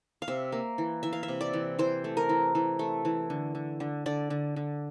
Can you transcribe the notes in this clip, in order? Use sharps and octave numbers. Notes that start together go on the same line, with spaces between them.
F5
C3 E5
A#3
E3
E3 E5
F5
E5
C3
D5
E3
E3 C5
A3
A#4
E3
E3
A3
E3
D3
D3
D3
D3 D5
D3
D3